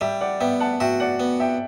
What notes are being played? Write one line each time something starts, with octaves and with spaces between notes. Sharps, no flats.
G3 E5 G5
D5 F#5
B3 E5 G5
F#5 A5
F#4 E5 G5
D5 F#5
B3
E5 G5